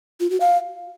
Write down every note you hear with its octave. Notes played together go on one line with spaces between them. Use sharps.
F4
F#4
F5